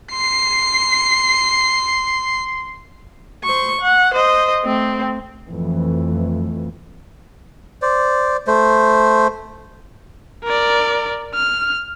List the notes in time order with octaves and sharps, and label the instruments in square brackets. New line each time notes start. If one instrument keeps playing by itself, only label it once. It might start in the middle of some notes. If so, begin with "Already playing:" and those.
[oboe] C6 [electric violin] C7
[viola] C5 C#6
F#5
C5 D#5
A3 C4
[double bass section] F2 E3 A3
[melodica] C5 D5
A3 C5
[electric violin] A#4 D5
F6